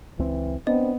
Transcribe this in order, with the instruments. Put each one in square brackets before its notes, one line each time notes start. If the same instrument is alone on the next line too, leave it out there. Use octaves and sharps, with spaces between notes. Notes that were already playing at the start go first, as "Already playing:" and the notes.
[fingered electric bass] C#2 C4 [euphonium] E3
[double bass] B3 [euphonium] C4 [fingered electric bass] D4 [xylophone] D#5